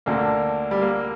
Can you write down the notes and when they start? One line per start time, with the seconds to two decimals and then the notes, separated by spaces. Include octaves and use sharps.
0.06 D2 D3 A#3
0.71 G3
0.82 A#3